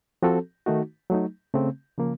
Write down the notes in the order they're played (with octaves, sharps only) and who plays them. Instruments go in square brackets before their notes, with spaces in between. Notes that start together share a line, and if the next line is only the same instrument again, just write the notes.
[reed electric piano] F3 C4 F#4 A4
D#3 A3 D#4 F#4
F#3 A3 D#4
C#3 A3 C4
C#3 F3 A#3